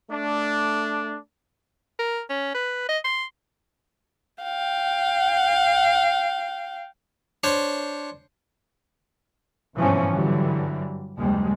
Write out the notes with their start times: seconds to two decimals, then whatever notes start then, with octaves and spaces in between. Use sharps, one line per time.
0.11 A3 D4
1.99 A#4
2.29 C#4
2.55 B4
2.89 D#5
3.04 C6
4.43 F5 G5
7.44 D4 C5 C#5
9.76 G#1 G2 B2 E3 F3 C#4
10.09 G2 D3 E3 F#3 G3
11.18 F#1 D#2 G3 G#3